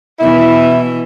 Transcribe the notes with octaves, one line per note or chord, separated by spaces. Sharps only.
B2 E3 E4